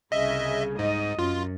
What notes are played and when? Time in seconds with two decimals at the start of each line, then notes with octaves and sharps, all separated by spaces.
0.12 C2 C#3 D#5 E5
0.79 G#2 D#5
1.19 F#2 F4